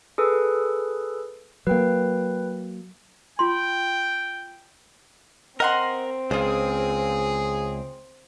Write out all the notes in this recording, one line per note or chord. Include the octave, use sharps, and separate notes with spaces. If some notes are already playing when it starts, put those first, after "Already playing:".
G#4 A4 B4
F#3 A#3 B4 G5
F4 G5 C6
C4 A#4 D#5 F#5 C6
C#2 F4 G#4 C5